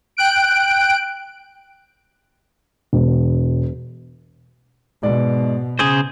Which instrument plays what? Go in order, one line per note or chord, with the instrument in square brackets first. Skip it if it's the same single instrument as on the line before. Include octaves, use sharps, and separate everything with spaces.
[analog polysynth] G5 F#6 D7
[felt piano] E1
[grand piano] G#2 D5 [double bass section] B2
[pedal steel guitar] C#3 G#4 C5 [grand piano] D#6